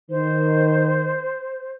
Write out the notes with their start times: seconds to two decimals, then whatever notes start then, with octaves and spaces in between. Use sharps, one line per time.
0.11 D#3 C5